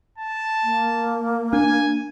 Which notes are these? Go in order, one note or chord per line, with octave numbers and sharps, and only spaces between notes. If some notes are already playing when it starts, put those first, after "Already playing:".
A5
A#3
D4 G#5